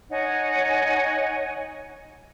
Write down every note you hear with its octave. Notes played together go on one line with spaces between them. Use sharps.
D#4 C#5 F#5 G#5